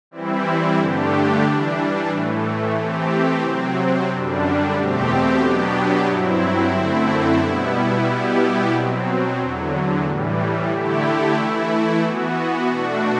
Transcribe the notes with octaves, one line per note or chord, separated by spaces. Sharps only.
E3 G3 C4 E4
G2 D3 A3 D4 G4
E3 G3 D4
A2 E3 A3
E3 A3 C4 G4
C3 F#3 C4
F#2 D3 G3 D4
E2 B2 A3 C4 G4
B2 F#3 B3 D4 G4
G2 F#3 C4 E4
F#2 D3 A3 C4 E4
B2 G3 B3 E4
B2 G3 B3 E4 G4
B2 F#3 C4
E2 D3 F#3
A2 E3 G3
D3 A3 E4 G4
E3 A3 E4
E3 B3 F#4
B2 A3 D4 F#4